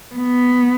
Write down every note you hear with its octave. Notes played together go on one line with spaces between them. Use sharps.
B3